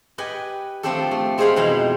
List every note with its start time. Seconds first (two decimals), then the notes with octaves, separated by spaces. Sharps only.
0.18 G4 B4 D#5 F#5 G#5
0.83 F3 A3 C4 D4 G4 A4
1.11 A3
1.38 G#3 C4 G#4 C5 F5 B5
1.56 F2 B2 E3 D#4 A#5 B5